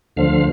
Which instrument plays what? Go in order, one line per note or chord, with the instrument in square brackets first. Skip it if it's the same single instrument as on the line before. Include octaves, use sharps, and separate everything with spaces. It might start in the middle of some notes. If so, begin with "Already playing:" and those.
[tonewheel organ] D2 D3 F3 F5